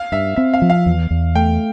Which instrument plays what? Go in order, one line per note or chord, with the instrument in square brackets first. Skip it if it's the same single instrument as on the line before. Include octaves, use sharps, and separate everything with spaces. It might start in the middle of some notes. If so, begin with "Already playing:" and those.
Already playing: [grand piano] F5
[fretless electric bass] G2 [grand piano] E5
[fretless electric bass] C4 [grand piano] E5
[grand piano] F5
[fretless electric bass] F3
[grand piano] F5
[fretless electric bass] E2
E2
[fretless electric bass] A3 [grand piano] G5